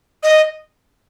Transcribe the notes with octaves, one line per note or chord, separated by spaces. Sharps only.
D#5